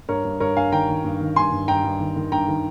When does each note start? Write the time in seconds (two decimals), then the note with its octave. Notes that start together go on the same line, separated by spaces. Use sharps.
0.09 G2 A#4 C#5
0.25 G2
0.40 G2 A#4 C#5
0.57 G2 F5 G#5
0.72 D#3 G5 A#5
0.88 D#3
1.04 G2
1.21 D#3
1.36 G2 G#5 C6
1.52 G2
1.68 G2 G5 A#5
1.84 G2
2.00 D#3
2.16 D#3
2.32 G2 G5 A#5
2.48 D#3